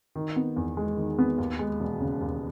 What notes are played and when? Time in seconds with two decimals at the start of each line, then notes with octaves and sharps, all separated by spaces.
0.16 D#3
0.36 B3
0.56 E2
0.77 G#3
0.97 D#3
1.18 B3
1.38 D#2
1.59 G#3
1.80 E1
2.00 C#3
2.21 D#2